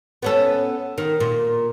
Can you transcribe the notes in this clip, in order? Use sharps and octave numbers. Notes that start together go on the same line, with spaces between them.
B3 C#4 A4
D#3
A#2